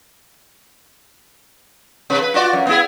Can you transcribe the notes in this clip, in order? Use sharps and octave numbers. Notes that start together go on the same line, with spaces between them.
C3 B4
B4
F4 F#4 D5
F#2
B3 E4 G#4